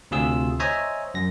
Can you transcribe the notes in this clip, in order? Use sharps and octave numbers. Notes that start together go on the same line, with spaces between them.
D2 C3 F4 G#4 E6
C5 C#5 D#5 E5 G#5 A#5
F#2 A#6